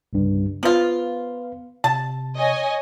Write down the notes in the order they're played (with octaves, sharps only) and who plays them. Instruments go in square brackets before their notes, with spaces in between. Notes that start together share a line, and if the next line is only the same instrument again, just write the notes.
[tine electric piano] C2 G2 C#3
[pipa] F3 F4 [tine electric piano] B3 B4 F5
[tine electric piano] C3 [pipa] A5
[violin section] C#5 D#5 G#5